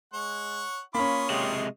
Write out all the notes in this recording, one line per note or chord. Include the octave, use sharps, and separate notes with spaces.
G#3 C#5 F#5 C#6
A#3 C#4 F4 B5 C#6 D#6
C3 G#3 G4